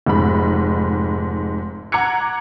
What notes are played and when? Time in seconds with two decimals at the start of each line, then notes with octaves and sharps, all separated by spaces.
0.06 F1 G#2 B5
1.92 F#5 A#5 D6 G#6 C#7